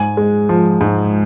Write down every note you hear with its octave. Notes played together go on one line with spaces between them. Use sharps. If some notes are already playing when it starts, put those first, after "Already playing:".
Already playing: G#2 G#5
G#3
F3
G#2